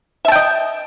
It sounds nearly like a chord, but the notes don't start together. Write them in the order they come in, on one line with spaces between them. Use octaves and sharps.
E5 A5 G5 D#5